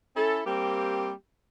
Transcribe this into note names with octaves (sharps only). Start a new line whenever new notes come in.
C#4 E4 A4
G3 A#3 C4 G4